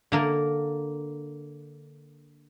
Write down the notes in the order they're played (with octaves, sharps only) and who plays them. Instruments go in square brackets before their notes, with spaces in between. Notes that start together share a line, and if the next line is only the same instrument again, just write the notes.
[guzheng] D3 A#3 A#4